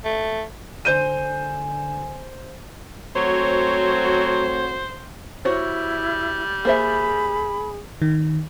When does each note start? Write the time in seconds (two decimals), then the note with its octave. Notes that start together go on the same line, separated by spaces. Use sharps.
0.05 A3
0.85 D3 C5 G#5 G6 D#7
3.16 F#3 A3 C4 F#4 C5 C#5
5.45 G3 E4 F#4 C5 C#5
6.65 A#3 G#4 C5 E5 B5
8.02 D#3